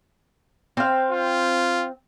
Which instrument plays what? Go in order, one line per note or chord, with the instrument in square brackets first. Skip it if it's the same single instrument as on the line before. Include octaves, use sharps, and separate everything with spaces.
[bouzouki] C4 F5
[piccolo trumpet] F4